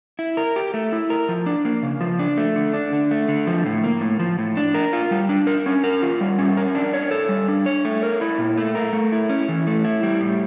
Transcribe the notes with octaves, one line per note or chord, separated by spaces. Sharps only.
E4
A#4
G4
A3
E4
A#4
F3
D4
A#3
C#3
F3
D4
A3
D3
D4
D3
A3
D3
F3
A2
A#3
A2
F3
A2
D4
A#4
F4
G3
D4
A#4
C#4
A#4
F4
G3
C#4
A#4
D4
C#5
A4
G3
D4
C#5
A3
A#4
E4
A#2
A3
A#4
A3
E4
C#4
E3
A3
E4
G3
A2